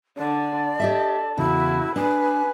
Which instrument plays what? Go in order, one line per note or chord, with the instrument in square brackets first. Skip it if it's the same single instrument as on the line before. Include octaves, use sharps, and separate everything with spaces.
[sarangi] D3 [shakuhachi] D5
[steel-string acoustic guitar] G4 D#5 E5 [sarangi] A4
[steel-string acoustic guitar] E2 C#3 [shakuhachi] E4 [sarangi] F#4
[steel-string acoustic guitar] D4 [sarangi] B4 [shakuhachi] G#5